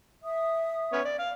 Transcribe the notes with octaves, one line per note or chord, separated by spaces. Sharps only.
E5 D#6
B3 C#4 C#5
D5
F5